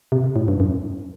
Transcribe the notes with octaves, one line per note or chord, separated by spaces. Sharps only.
C3
A2
G2
F#2